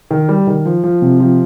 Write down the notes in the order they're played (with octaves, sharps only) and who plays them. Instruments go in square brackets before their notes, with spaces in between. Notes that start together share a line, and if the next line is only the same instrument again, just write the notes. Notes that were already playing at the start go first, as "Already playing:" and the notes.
[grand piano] D#3
G3
D#3
F3
F3
C3
F3